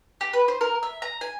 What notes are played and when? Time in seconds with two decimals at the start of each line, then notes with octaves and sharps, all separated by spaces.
0.21 G4
0.33 B4
0.48 C5
0.61 A#4
0.83 E5
1.02 A#5
1.21 G#5